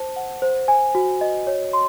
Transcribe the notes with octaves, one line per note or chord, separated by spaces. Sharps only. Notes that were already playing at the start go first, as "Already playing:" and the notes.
Already playing: C5 A5
F#5
C5
G#5
F#4
D#5
C#5
C6